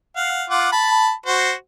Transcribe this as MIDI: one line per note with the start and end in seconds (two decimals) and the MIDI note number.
0.16 0.44 77
0.16 0.44 78
0.50 0.68 65
0.50 0.68 78
0.50 0.68 86
0.72 1.12 81
0.72 1.12 83
1.26 1.52 66
1.26 1.52 72